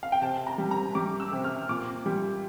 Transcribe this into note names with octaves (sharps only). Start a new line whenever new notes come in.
F5
G5
C3 A5
A#5
G3
A#5
G3 D6
E6
C3
F6
A#2 D6
G3